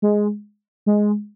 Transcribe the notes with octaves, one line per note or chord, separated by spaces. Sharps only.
G#3
G#3